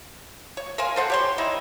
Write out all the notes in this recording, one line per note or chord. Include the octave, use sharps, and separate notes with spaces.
C#5
A#4 C5 F5 G#5
A4 C5 F#5
G4 C#5 C6
D#3 D#4 E4